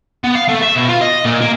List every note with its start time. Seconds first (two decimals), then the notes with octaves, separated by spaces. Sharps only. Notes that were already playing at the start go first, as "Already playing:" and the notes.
0.24 B3
0.35 F5
0.49 A3
0.63 E5
0.76 B2
0.89 F4
1.01 D#5
1.25 A#2
1.41 A#3